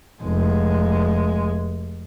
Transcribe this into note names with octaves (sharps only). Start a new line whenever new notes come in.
F1 G#3